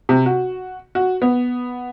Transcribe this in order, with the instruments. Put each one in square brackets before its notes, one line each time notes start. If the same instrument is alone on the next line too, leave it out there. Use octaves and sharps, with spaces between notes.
[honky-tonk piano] C3
F#4
F#4
B3